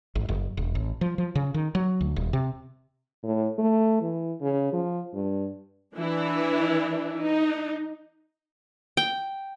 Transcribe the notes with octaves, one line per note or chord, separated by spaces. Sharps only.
G#1
F#1
E1
A1
F3
F3
C#3
D#3
F#3
D2
D#1
C3
A2
A3
E3
C#3
F3
G2
E3 D4 E4
D#4
G5